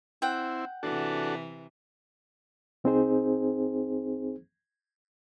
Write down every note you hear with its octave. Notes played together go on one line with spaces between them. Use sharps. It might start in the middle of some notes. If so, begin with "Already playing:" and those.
C4 E4 F#5 G5
C3 E3 D4 F#4 A4
C2 C4 D#4 G#4 C5